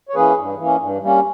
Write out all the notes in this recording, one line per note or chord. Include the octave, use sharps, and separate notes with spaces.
C#5
E3 A#3 C#4 G#4 B4
G2
E3 A#3 C#4
G2
G3 A#3 C#4